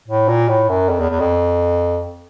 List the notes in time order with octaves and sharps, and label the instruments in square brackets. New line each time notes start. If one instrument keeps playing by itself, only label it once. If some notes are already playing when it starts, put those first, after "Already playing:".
[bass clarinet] A2
A#2
A2
F#2
F2
E2
E2
F2